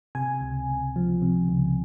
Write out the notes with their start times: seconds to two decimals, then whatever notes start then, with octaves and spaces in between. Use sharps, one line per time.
0.15 C3 G#5
0.41 C#2
0.69 C#2
0.96 F3
1.22 C3
1.49 C#2